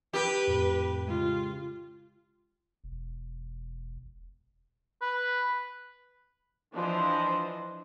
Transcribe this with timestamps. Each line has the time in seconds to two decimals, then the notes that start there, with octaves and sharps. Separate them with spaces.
0.14 G4 B4
0.47 F2 A2
1.08 C#3 G#3 F4
2.84 E1
5.01 B4
6.73 E3 F3 D4 C5 D#5